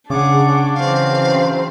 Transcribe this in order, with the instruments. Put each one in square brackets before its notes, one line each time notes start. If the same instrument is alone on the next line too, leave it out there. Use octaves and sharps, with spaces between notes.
[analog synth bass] C#3 [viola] D4 [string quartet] G#4 C#5 F#5 [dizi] D6
[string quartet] E3 F#3 C4 [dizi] F5